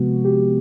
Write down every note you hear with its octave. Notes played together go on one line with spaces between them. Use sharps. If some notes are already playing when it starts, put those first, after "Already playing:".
Already playing: C3 F3 G#3 B3 F#4
G4